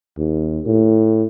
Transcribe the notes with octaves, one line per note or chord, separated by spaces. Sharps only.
D#2
A2